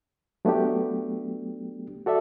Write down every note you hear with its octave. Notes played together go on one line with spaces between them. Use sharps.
F#3 A3 B3 D4 G4
F#4 A4 D5 E5